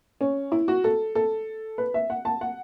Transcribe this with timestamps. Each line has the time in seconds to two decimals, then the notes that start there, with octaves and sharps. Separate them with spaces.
0.21 C#4
0.52 E4
0.68 F#4
0.84 A4
1.15 A4
1.78 B4
1.94 E5
2.10 F#5
2.25 A5
2.41 F#5